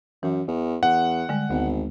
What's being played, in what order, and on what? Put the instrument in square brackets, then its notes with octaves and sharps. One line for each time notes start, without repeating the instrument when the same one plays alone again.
[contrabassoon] F#2 [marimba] E3
[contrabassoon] E2
[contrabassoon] E2 [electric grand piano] F#5
[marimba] D3 G3 G#3
[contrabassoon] G#1 [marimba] D2 B3